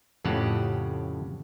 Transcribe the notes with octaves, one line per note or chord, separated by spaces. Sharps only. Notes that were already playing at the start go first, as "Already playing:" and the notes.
F2 A2 C#3 G4 F#5